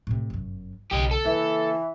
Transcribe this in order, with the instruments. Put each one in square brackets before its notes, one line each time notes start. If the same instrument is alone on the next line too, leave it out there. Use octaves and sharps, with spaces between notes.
[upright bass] A2 C3
G1 F#2
[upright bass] B1 C#3 [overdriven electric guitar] G4 D#5
[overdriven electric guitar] A4
[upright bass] C#3 A#3 [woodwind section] E3